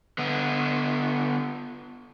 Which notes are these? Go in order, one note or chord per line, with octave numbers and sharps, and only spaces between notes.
D3 B3